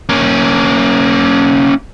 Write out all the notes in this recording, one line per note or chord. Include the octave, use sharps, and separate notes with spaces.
A#3 C#4